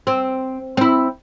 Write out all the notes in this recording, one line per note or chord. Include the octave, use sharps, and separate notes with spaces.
C4
C4 E4